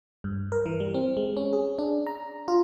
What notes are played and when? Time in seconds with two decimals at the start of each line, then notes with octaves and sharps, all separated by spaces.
0.24 G2
0.52 A#4
0.66 E3
0.80 G3
0.94 C4
1.17 G#3
1.37 C#4
1.53 G#4
1.79 D4
2.07 A#5
2.48 F4